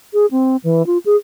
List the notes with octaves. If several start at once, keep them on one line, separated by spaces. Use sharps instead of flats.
G#4
C4
E3
F4
G#4